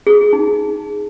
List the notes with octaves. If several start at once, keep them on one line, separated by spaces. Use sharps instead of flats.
G#4
D#4